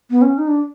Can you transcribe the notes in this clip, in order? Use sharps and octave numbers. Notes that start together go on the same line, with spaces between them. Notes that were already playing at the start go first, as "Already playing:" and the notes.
B3
C#4
D#4
D4